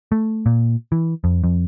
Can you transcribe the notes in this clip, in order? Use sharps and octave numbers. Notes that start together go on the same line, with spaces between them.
A3
A#2
E3
F2
F2